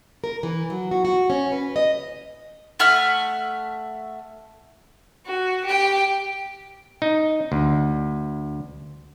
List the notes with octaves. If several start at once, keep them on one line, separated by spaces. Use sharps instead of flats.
A#4
E3
F#3
F#4
F#4
C#4
B4
D#5
A3 E5 F#5 F6
F#4
G4 G5
D#4
D2